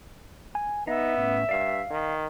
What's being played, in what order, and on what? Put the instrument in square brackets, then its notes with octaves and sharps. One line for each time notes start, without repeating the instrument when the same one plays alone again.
[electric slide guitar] G#5
[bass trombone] B3 [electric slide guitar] D#4 D#5 [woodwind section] E5
[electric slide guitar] A2 C#4
[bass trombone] G2 [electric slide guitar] D5 F5
[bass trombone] D#3